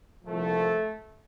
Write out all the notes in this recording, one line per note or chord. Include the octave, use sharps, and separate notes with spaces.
C2 A#2 F3 A3